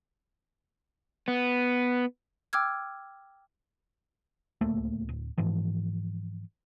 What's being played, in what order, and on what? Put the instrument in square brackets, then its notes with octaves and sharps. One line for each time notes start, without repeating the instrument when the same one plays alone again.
[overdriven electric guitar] B3
[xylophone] G5 D6 E6 F6 G#6
[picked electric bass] D1 C#2 A3 A#3
D1
G#2 E3 F3